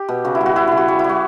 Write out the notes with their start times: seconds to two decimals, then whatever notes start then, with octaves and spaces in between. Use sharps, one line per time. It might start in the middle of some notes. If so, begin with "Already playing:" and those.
Already playing: G4
0.08 B2
0.24 C#3 F#4
0.35 E4
0.41 G3
0.46 F#4
0.56 G3 E4
0.67 C#3 E4
0.77 F#4
0.88 G3 F#4
0.99 E4
1.04 G3
1.09 F#4